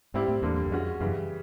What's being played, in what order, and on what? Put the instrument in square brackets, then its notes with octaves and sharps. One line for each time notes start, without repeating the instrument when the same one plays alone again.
[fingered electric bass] G#2 [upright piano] G3 C4 E4 G4
[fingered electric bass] A2
[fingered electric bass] E2 [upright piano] D3 G3 A#3
[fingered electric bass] E2
[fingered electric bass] F2 [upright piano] G#3 C#4 F#4
[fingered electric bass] F#2 [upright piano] C#3 E3 G3